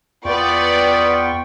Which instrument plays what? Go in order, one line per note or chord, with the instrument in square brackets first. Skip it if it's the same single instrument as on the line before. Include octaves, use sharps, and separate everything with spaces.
[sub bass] E2 [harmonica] B3 [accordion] F4 G5 C#6 [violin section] B4 D5